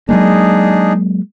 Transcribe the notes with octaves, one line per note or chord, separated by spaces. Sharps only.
F#3 G#3 A#3 D4 D#4 G#4